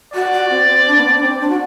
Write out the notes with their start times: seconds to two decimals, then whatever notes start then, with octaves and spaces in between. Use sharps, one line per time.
0.14 F#4 D5
0.32 F#4
0.50 C4
0.68 C4
0.87 D4
0.97 B3
1.05 C4
1.16 D4
1.22 C4
1.41 D4
1.50 F#4